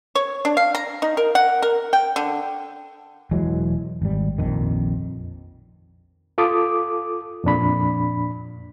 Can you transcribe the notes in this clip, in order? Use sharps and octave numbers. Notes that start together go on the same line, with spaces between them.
C#5
D4
F5
A#5
D#4
A#4
F#5
A#4
G5
D3
E1 E3 F#3 G#3
G#1 G3
A#1 F2 D#3
F4 A4 D6 D#6
F2 A#2 D4 B5